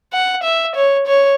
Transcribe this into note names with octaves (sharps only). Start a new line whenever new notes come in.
F#5
E5
C#5
C#5